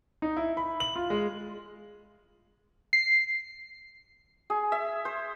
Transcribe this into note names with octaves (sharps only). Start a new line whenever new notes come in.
D#4
E4
B5
F#7
F4
G#3
C7
G#4
E5
C5